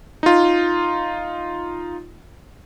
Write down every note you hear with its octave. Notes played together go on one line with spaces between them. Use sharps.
D#4 F4